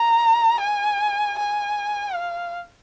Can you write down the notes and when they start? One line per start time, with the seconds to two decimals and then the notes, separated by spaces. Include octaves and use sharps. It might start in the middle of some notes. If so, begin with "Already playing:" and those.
Already playing: A#5
0.60 G#5
1.38 G#5
2.15 F5